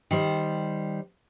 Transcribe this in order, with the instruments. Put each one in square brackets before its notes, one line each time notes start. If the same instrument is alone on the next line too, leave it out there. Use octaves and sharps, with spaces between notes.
[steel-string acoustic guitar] D#3 G3 C5